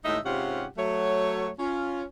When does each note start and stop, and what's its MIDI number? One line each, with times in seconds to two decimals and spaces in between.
0.05 0.19 39
0.05 0.19 45
0.05 0.19 56
0.05 0.19 63
0.05 0.19 76
0.26 0.66 44
0.26 0.66 48
0.26 0.66 61
0.26 0.66 65
0.26 0.66 67
0.26 0.66 78
0.78 1.49 54
0.78 1.49 57
0.78 1.49 73
1.59 2.04 61
1.59 2.04 65